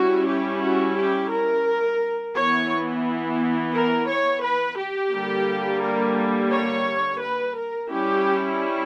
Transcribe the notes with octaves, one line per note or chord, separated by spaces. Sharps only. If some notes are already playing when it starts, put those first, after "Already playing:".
Already playing: G3 C#4 E4 F#4
G4
F#4
G4
A#4
E3 B3 E4 C#5
A#4
C#5
B4
G4
D3 G3 A#3
A#4
C#5
B4
A#4
G3 C#4 E4 G4